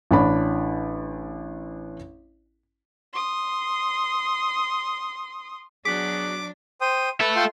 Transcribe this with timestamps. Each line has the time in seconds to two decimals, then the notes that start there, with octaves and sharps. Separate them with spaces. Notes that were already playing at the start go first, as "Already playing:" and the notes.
0.11 A1 D4 C#5 B5
3.13 C6 D#6
5.85 B2 F#3 D4 F#4 G#4 D6 B6
6.81 C5 G5 D#6
7.21 A4 B4 E5
7.36 F4 G5 C6